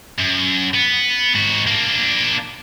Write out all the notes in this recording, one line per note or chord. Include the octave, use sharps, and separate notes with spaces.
F#2
B3
G#2 F#4
A#3 D4